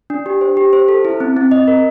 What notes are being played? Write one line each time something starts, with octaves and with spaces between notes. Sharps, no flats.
D4
G4
C5
G4
C5
A4
E4
C4
C4
D#5
A#4